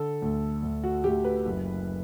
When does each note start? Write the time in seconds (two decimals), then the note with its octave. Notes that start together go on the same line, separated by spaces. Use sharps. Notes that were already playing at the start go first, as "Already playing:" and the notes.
Already playing: D3 A4
0.22 D2
0.63 D2
0.83 F#4
1.04 D2 G4
1.24 B4
1.46 F#1